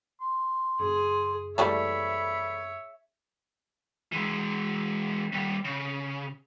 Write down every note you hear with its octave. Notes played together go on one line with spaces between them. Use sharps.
C6
F#1 G#4
F#1 E3 G3 A3 C#5 E5 B5
E3 G#3
D#2 G3
C#3